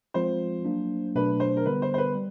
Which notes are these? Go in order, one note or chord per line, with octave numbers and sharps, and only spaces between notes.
F3 G#3 C4 F4 C5
F#3 A#3 D4
B2 F#3 A3 D4 B4
C5
A#4
D3 G3 B3 B4
C5
C5
B4
G3